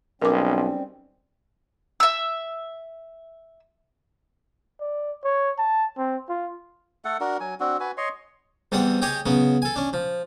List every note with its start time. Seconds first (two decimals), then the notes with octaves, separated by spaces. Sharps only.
0.22 B1 G3 C4 C#4 A#4 D6
2.00 E5 E6
4.80 D5
5.24 C#5
5.59 A5
5.98 C4
6.29 F4
7.05 A3 A4 F#5
7.20 D4 F#4 A#4
7.40 F#3 G#5
7.60 C4 D4 F#4
7.80 F#4 B4 G#5
7.97 C#5 D#5 C6
8.72 E2 G3 C4 F#5 D#6
9.02 G4 G#4 C#5 D#5 G5
9.26 C#3 F#3 B3
9.62 A4 G#5
9.76 C#4 D4
9.93 F3